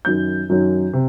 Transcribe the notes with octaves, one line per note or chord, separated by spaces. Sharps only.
F#2 D#3 F#3 G6
F#2 D#3 F#3
C3